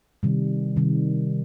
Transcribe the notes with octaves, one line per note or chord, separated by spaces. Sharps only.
C3 D#3 G3
C3 D#3 G3